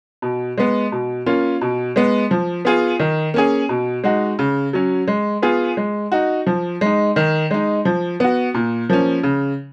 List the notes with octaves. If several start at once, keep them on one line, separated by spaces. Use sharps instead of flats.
B2
G#3 B3
B2
A#3 C#4 F4
B2
G#3 B3
F3
B3 F4 G#4
D#3
A#3 C#4 G#4
B2
G#3 D#4 F#4
C#3
F#3 C#4
G#3
B3 F4 G#4
G#3
D#4 F#4
F3
G#3 D#4
D#3
G#3 D#4
F3
B3 F#4
A#2
F3 A#3 C#4
C#3